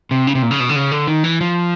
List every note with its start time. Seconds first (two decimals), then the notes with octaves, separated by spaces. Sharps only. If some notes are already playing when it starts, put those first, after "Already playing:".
0.11 C3
0.27 C#3
0.35 C3
0.42 A#2
0.51 C#3
0.60 B2
0.69 D3
0.76 C#3
0.91 D3
1.07 D#3
1.24 E3
1.41 F3